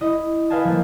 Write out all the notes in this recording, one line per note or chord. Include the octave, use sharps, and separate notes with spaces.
E4 D#5
B4 D#5 F5 G#5 A5
F3 A#3